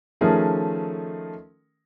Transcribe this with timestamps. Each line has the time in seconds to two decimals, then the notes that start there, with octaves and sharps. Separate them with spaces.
0.21 D#3 F3 A3 C#4 G#4 A#4